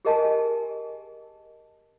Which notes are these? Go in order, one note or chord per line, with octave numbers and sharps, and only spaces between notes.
G4 G#4 A#4 D#5 G#5 A5